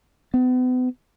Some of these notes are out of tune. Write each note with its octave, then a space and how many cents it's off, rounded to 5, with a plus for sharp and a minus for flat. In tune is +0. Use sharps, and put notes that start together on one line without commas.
B3 +40